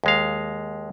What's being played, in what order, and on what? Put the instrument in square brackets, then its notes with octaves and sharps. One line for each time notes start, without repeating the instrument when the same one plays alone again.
[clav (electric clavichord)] D#2 G#3 F5